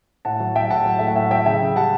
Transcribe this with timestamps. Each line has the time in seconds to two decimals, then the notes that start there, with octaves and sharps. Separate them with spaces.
0.25 A2 F#5 A5
0.40 F#3
0.55 F#3 E5 G5
0.70 A2 F#5 A5
0.85 F#3
0.99 A3 E5
1.07 F#5
1.15 A2 E5 G5
1.31 F#3 E5 G5
1.46 C#3 E5 G5
1.61 C#3
1.76 G3 F#5 A5